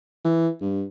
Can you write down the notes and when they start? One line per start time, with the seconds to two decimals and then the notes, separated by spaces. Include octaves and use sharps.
0.25 E3
0.61 G2